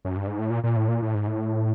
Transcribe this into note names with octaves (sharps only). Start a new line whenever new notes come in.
F#2
G2
G#2
A2
A#2
A#2
A2
A#2
A2
G#2
A2